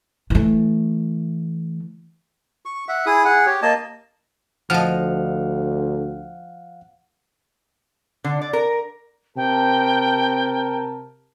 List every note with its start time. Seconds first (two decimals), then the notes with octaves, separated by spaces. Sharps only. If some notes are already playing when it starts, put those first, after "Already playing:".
0.30 E3 A3
2.65 C#6
2.88 E5 F#5
3.06 E4 G#4 D#6
3.25 G#4 F#5
3.46 G4 C#5
3.62 A#3 D#5 A5
4.70 D2 F3 D#5 F5 F#5 F6
8.24 D3
8.41 D5
8.53 A#4
9.37 C3 A#4 G5 A5